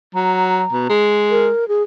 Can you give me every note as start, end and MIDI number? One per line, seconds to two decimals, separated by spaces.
0.15 0.63 54
0.15 0.92 82
0.72 0.87 47
0.89 1.48 56
1.31 1.68 70
1.68 1.83 68